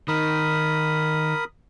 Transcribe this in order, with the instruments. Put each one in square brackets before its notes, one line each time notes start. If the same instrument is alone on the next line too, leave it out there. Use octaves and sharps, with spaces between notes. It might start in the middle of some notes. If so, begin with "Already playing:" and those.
[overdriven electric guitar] D#3 [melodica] A#4 B5 D#6